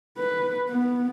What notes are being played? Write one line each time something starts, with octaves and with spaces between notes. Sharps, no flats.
B4
B3